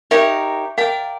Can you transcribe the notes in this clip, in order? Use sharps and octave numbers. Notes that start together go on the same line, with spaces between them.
D#4 G4 A#4 C#5 E5
A#4 D5 F5 G5